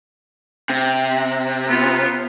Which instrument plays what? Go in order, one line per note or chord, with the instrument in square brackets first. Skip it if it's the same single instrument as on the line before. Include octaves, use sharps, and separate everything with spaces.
[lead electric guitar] C3
[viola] B3 F4